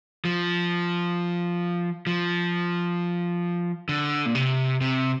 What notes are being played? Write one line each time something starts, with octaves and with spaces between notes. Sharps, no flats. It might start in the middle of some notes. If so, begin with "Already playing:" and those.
F3
F3
D3
A#2
C3
C3